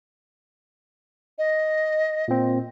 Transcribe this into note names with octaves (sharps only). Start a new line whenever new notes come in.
D#5
A#2 C4